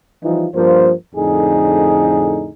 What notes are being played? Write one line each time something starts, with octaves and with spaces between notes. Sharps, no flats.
E3 F3 G3 D#4 F4
G2 F3 A#3 C5
F2 A2 D3 D#4 G#4